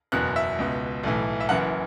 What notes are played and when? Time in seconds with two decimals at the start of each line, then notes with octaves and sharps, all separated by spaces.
0.12 F#1 E2 B2 F#6
0.36 E5
0.59 C#2 B2
1.03 B1 A2 E3
1.40 E5
1.49 F#1 F#2 E3 F#5